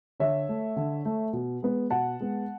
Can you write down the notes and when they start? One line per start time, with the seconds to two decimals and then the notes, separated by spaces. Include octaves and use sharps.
0.20 D3 C#5 E5
0.49 A3
0.76 D3
1.05 A3
1.33 B2
1.62 G#3 B3
1.90 B2 F#5 A5
2.20 G#3 B3